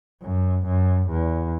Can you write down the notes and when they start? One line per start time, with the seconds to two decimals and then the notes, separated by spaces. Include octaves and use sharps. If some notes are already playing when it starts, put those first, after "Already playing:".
0.22 F#2
0.66 F#2
1.10 E2